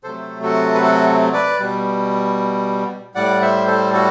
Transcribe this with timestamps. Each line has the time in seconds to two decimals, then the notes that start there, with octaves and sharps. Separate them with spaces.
0.04 C3 F#3 A3 A4 C5
0.42 F#4 A4
0.74 B4
0.82 F#4 A4
1.33 B4 D5
1.60 B2 G3
3.15 A2 G3 D5 F#5
3.42 C5 E5
3.67 A4 C5
3.93 F#4 A4